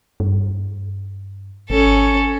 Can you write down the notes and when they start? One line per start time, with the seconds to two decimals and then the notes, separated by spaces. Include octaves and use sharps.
0.20 G2
1.70 G#1 C#4 A4